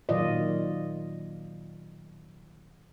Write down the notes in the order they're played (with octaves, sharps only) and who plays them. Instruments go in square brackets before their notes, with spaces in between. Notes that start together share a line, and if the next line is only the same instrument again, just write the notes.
[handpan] A#2 D#3 F#3 F4 D5 D#5